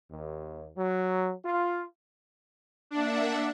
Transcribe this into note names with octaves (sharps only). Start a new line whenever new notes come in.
D#2
F#3
F4
A#3 D4 E5 F#5